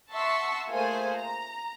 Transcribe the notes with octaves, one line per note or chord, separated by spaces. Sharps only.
E5 F#5 A5 C6 C#6 E6
A3 A#3 F4 G#4 C5 G#5
A#5